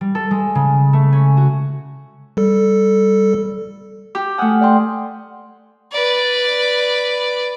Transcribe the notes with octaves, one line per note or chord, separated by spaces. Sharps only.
G3
A4
G#3
C#3
A3
C#4
F#4
G3 A4
G4 D6
A3 F#5 G#5 D#6 F6
D5 G5 C6
B4 D5